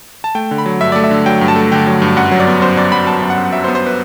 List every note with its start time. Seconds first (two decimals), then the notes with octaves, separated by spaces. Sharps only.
0.24 A5
0.35 A3 G5
0.51 D3
0.58 B5
0.66 F#3
0.81 G2 E5
0.92 A3 D5
1.04 E5
1.11 D3
1.26 F#3 G5
1.41 G2
1.48 A5
1.56 A3
1.72 D3 G5
1.87 F#3
2.02 G2
2.17 F#2 F#5
2.31 F#3
2.40 D5
2.47 B3
2.61 F#2 C5
2.77 F#2 D5
2.92 F#3 B5
3.07 B3 A5
3.22 F#2
3.30 F#5
3.38 F#2
3.52 F#3 E5
3.64 C5
3.68 B3
3.75 C5
3.87 B4